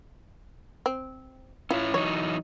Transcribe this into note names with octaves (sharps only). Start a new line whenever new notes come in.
C4
C#4 E4 F4 C#5
E3 F#3 D#4 C#5